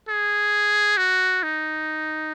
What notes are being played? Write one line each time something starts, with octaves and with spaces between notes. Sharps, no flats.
G#4
F#4
D#4